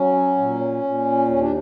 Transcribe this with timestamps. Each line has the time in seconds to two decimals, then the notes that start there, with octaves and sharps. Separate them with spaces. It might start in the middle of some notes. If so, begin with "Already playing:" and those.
Already playing: F#3 C#4
0.38 A#2
0.83 A#2
1.28 D#2 C#4
1.40 D4